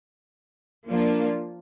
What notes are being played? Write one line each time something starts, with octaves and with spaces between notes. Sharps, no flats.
F3 A#3 D4 F4